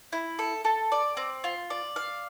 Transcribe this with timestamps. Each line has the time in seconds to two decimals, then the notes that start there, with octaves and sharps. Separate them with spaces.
0.13 E4
0.39 A4
0.65 A4
0.92 D5
1.17 C4
1.44 F4
1.70 D5
1.96 F5